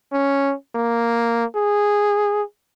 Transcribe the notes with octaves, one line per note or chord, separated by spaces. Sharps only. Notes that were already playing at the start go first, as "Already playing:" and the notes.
C#4
A#3
G#4